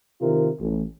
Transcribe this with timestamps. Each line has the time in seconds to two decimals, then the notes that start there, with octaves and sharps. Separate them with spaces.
0.22 C3 D#3 F4 A#4
0.61 A1